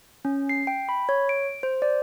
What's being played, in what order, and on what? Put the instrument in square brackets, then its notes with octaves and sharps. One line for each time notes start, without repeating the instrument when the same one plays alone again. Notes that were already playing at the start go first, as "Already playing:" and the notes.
[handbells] C#4
C7
G5
B5
C#5
D7
C5
D5